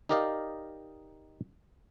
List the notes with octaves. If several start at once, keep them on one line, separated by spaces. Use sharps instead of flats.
D#4 G4 A#4 D5 D#5 F5